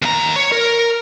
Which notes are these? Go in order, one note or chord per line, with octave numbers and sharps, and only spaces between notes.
D#2 A#5
C#5
A#4